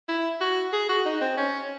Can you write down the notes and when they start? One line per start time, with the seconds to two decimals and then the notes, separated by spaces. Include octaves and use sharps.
0.08 E4
0.40 F#4
0.73 G#4
0.89 F#4
1.05 D#4
1.21 C4
1.37 C#4